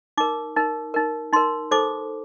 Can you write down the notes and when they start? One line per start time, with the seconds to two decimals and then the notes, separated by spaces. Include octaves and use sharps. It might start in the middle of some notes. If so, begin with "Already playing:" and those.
0.17 D#4 A#4 D6
0.56 D#4 A#4
0.94 D#4 A#4
1.33 D#4 A#4 C6
1.71 D#4 A4 C5 D6